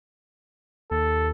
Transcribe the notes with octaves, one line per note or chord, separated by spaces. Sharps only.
D#2 A4